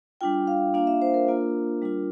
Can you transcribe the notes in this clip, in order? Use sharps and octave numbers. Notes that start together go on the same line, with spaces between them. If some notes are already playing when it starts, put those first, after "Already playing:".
G3 D4 F4 G5
F5
A#3 D4 F4 F5
E5
C5
A#4
A#3 D4 F4
G3 D4 F4